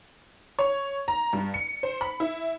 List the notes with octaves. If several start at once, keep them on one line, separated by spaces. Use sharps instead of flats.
C#5
A#5
G2
C#7
C5
B5
E4